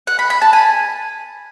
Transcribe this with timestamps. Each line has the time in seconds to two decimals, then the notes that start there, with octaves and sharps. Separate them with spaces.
0.07 F#5
0.19 B5
0.30 B5
0.42 A5
0.53 G#5